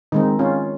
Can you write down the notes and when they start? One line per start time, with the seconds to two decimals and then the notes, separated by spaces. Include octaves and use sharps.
0.12 D#3 G#3 C4 D#4
0.39 C#4 F4